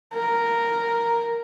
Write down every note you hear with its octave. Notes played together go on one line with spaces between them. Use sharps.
A#4